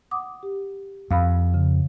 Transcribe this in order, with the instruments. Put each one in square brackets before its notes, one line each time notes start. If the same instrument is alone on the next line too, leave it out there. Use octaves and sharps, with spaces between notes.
[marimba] F#5 D6 D#6
G4
[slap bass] F2 [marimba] F5 B5
[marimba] C#3